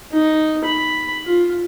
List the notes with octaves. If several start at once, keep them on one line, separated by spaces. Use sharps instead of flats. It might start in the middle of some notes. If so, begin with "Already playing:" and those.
D#4
B5
F4